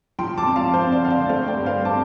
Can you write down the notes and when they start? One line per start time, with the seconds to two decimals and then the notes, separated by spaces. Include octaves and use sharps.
0.19 F3 G5 C6
0.38 A5 D6
0.46 F2
0.56 F5 A5
0.74 C4 C5 F5
0.92 D5
1.01 D3 F5
1.10 D5
1.29 A3 C5 F5
1.48 D5 G5
1.57 G2
1.66 C5 F5
1.85 C4 A5 D6